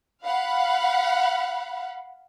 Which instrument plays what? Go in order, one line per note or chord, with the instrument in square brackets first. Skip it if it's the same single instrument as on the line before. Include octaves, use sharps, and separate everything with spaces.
[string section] F5 F#5 B5